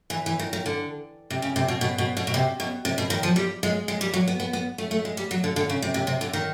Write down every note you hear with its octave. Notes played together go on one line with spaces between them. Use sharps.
E3
E3
D#3
D#3
D3
C3
C#3
C3
B2
B2
B2
B2
B2
C3
B2
C3
B2
D#3
F3
G3
G#3
G#3
G3
F#3
B3
B3
B3
A3
A3
G#3
G3
F#3
D3
D3
C#3
C3
C3
C3
D3
D#3